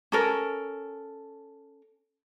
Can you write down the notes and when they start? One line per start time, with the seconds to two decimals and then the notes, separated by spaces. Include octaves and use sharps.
0.12 C#4 A4 A#4